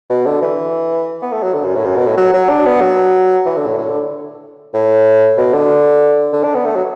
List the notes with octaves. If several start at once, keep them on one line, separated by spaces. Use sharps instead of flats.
B2
D3
E3
B3
A3
F#3
D3
F#2
A2
F#2
B2
A2
F#3
F#3
D4
B3
F#3
E3
D3
A2
A2
D3
A2
B2
D3
D3
D4
B3
A3
F#3